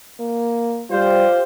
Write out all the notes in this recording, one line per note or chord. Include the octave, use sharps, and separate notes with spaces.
A#3
G3 F4 G4 C5